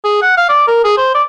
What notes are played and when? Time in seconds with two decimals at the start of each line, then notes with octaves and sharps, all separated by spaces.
0.04 G#4
0.22 F#5
0.37 F5
0.49 D5
0.68 A#4
0.84 G#4
0.97 C5
1.14 D5